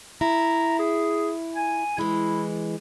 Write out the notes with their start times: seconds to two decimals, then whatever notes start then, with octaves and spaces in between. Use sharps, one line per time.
0.21 E4 A#5
0.79 G#4
1.55 G#5
1.98 E3 G#3 E4